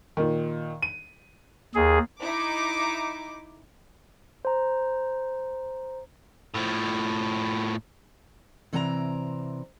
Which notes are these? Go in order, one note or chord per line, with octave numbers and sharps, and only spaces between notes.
A#2 D#3
D#7
D#2 G#4
D#4 E4 D6
C5 A#5
A2 F3
C3 E3 C4 D5 A5 A#5